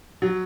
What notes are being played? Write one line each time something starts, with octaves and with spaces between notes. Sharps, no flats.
F#3